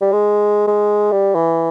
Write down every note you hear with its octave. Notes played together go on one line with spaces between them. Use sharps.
G3
G#3
G#3
G3
E3